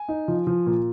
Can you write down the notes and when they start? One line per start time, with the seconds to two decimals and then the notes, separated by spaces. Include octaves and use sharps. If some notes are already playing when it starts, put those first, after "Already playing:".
Already playing: G#5
0.08 D#4
0.28 F3
0.47 F3
0.66 A#2